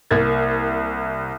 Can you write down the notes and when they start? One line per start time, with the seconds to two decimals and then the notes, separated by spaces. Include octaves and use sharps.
0.11 C2 A#3 G#6 A6